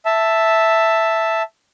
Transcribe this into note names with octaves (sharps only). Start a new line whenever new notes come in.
E5 A5